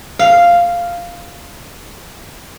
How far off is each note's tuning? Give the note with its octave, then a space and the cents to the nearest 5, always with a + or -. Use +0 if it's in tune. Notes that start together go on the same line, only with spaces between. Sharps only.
F5 -5